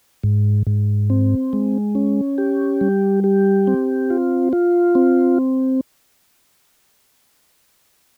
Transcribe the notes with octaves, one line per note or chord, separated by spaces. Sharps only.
G#2
G#2
C4
G#3
C#4
G4
G3
G4
C4
F4
F4
C4